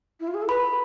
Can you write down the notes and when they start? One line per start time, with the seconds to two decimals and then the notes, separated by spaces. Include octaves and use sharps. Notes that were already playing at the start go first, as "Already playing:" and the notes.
0.20 E4
0.28 F4
0.34 G#4
0.42 A4
0.49 B4 B5